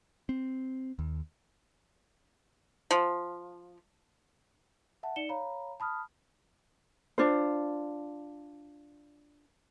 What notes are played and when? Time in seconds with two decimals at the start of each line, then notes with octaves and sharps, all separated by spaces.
0.29 C4
0.99 D#2
2.91 F3
5.03 E5 F#5 A5
5.16 D#4 D5 C#7 E7 G7
5.29 C#5 F5 A#5 B5
5.80 A5 B5 D#6 F6
7.18 D4 F4 C5